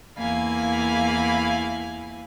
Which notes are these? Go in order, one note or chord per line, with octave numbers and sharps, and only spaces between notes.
E2 A#3 E4 F5 G#5 B5